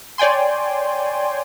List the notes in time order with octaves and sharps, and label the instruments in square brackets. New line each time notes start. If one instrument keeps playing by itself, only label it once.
[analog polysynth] C#5 D5 G5 G#5 C6